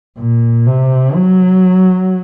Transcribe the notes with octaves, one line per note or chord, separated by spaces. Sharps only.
A#2
C3
F#3